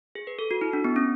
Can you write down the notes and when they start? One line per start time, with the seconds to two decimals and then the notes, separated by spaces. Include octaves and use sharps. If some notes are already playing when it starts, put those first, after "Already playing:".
0.15 G#4
0.27 B4
0.39 A4
0.51 F#4
0.61 E4
0.73 D4
0.84 B3
0.96 C#4